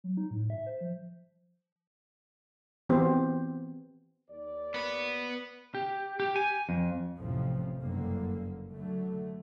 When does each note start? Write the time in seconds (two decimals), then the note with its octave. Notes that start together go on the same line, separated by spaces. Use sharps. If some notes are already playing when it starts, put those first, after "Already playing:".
0.04 F#3
0.17 D#4
0.31 A2
0.50 E5
0.66 C5
0.81 F3
2.89 E3 B3 C4 G4 C5
4.30 D#2 D5
4.74 B3 B4
5.75 G4
6.20 G4
6.36 G#5
6.69 F2
7.18 A1 F2 A2 C3 F3
7.81 F#1 G2 D3 A#3
8.73 D3 F#3 A3